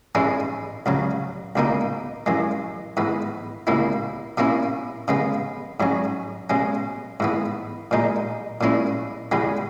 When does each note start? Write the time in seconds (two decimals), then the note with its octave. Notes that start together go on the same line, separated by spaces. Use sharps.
0.15 G#2 E3 G#3 C#4 E4
0.86 C#2 C#3 F#3
1.56 C#2 B2 A#3 D#4
2.26 F#2 E3 G#3
2.97 G#2 E3 B3
3.67 C#2 B2 A#3 E4
4.37 B2 A#3 C#4 E4
5.08 C#3 G#3 B3
5.80 G#2 F#3 C#4
6.50 B2 G#3 C#4
7.20 G#2 E3 B3
7.91 A#2 G#3 D#4
8.61 A#2 G#3 C#4 E4
9.32 E2 B2 G#3 B3